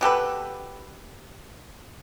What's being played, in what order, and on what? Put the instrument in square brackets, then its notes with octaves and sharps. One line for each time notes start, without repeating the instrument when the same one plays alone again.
[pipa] B2 G4 A4 B4